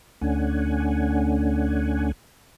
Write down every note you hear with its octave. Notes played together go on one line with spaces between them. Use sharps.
D2 A3 C#4 D4 F#5 G#5